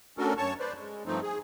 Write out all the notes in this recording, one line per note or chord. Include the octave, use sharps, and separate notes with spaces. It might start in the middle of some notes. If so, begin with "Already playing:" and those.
A3 C#4 D4 F#4 A4 A#4
F#2 C#5 A5 C#6
B4 C5 D5
G#3
G2 F3 A3 C4 D#4
G#4